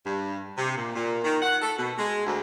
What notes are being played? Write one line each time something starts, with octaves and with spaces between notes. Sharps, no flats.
G2
C3
A#2
A#2
D#3
F#5
A4
B2
G#3
D2